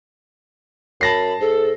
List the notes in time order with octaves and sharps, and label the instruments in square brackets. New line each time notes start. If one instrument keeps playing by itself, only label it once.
[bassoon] F#2 [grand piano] A5 A#6 C7 [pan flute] B5
[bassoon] G#2 [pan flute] A4